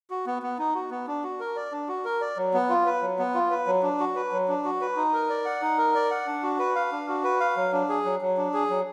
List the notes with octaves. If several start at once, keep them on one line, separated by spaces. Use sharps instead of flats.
F#4
B3
B3
D#4
F#4
B3
D4
F#4
A#4
D5
D4
F#4
A#4
D5
F#3
B3
F4
B4
F#3
B3
F4
B4
F#3
D4
F#4
B4
F#3
D4
F#4
B4
D#4
A#4
D5
F#5
D#4
A#4
D5
F#5
D4
F#4
B4
F5
D4
F#4
B4
F5
F#3
D4
G#4
F#3
F#3
D4
G#4
F#3